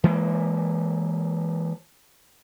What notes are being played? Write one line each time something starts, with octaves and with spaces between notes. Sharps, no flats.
E3 G#3 A#3